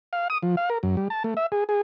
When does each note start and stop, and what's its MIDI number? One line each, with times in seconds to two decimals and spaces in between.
0.13 0.28 77
0.30 0.38 87
0.42 0.56 53
0.57 0.69 77
0.70 0.78 70
0.83 0.96 42
0.97 1.08 55
1.10 1.23 81
1.24 1.34 57
1.37 1.46 76
1.52 1.64 68
1.69 1.81 68